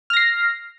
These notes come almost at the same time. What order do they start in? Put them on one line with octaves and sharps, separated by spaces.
F6 A#6 C7